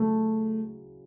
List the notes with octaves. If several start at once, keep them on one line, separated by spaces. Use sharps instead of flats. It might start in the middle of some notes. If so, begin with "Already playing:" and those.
Already playing: C#3 F#3 A3 E4